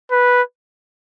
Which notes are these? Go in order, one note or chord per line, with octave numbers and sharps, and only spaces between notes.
B4